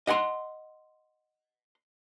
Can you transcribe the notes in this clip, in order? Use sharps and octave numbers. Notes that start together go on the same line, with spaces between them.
D#5 F#5 G#5 C6